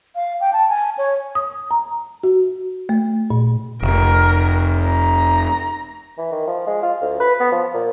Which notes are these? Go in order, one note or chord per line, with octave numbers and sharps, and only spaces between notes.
F5
G5
A5
G#5
C#5
D#6
A#5
F#4
A3
A#2
F1 A#4
A#5
E3
D#3
F3
G#3
F4
D2
B4
B3
F3
A#2